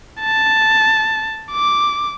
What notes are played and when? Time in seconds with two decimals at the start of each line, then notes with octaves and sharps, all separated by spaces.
0.20 A5
1.52 D6